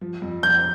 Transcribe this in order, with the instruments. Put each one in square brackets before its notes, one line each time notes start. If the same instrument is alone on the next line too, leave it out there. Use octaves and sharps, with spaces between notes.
[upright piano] F3
F2
[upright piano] F2 [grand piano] G6